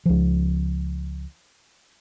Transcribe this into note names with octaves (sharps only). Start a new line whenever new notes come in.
C#2 F3